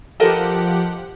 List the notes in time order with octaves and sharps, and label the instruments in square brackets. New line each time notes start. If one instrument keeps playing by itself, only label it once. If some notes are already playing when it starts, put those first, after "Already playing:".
[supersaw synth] F3 G4 F#5 [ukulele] A4 A#4 D#5